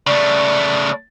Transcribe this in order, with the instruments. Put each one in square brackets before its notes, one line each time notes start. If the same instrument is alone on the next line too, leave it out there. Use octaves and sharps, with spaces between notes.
[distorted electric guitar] C#3 A3 [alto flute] D5